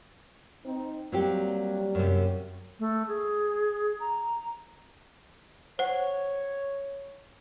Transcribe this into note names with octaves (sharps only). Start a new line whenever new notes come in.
C4 D#4
F#3 G3 A#3 C4 G4
F#2 C3
A3
G#4
A#5
C5 C#5 F#5